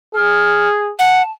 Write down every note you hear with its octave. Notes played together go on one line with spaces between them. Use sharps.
G#4 F6
F#5 A5